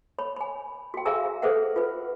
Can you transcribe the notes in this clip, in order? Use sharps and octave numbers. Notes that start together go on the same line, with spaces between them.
C#5 B5
G#5 B5
F#4 G5
G#4 E5 F5 G#5 A#5 E6
G#4 A4 B4 C5 E5 F#5
F4 B4